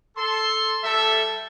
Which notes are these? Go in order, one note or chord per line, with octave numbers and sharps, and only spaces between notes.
A4 C6
G3 A4 E5